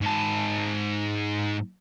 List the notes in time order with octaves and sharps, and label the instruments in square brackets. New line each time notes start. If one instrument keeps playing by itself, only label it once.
[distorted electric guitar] G#2 A5